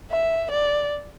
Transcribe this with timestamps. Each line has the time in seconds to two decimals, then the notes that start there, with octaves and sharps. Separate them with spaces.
0.10 E5
0.51 D5